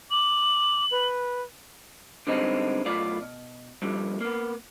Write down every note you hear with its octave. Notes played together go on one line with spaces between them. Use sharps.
D6 F#7
B4
D3 G3 G#3 B3 C4 D#4
B1 A2 B3 F4 D5
B2
G2 A#2 D3 F3 G3
A#3 B3